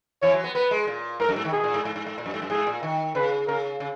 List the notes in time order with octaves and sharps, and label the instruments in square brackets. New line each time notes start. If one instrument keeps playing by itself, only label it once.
[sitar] E3 [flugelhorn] C#5
[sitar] F#3
B3
[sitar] B3 [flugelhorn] B4
[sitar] G#3
A#2
[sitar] G#2 [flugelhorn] A#4
[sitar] F#2
G#2
D#3
[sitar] B2 [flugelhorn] G#4
[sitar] A#2
G#2
G#2
G#2
G#2
A#2
F#2
G#2
F#2
[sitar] G#2 [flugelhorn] G#4
[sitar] A#2
D#3
[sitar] C#3 [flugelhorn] B4
[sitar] C#3 [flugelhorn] A#4
[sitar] C#3